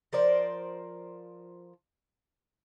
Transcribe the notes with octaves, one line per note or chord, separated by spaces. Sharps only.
F3 A#4 C5 D5